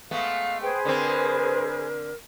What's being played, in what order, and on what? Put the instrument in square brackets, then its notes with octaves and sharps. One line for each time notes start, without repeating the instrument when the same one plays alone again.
[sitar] G#3 A3 B3 [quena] F5
[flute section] G#4 B4 C5 [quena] G5
[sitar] D3 C4 [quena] A#4